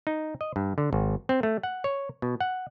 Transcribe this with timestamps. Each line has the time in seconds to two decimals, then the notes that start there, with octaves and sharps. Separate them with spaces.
0.07 D#4
0.41 D#5
0.56 G2
0.78 D3
0.93 G#1
1.29 C4
1.43 A3
1.63 F#5
1.84 C#5
2.22 B2
2.40 F#5